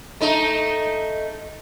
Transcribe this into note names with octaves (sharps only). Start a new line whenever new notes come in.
A3 D#4